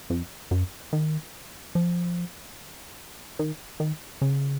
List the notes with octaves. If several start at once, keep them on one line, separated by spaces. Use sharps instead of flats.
F2
F#2
D#3
F3
D#3
D#3
C#3